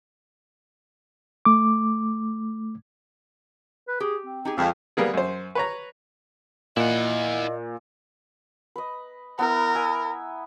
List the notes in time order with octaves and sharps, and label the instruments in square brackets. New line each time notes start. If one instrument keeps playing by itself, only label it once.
[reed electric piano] A3 D6
[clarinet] B4
[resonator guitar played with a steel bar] G4 [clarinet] G#4
[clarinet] C4
[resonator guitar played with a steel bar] D#4 G4 G#4
[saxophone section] F2 [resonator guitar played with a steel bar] G#3 G#4 F5 [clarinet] C4
[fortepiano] G3 A#3 B3 G#4
F#2 C5
B4 C#5 A#5
[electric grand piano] A#2 [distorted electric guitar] E4 F#5 [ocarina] D#5
[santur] B4 D#5
[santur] B3 E4 A#5 [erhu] A#4
[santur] E5 G#5